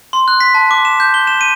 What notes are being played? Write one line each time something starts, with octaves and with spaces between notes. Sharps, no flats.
C6
F#6
B6
A5
D6
E7
G6
G7
E7
D#7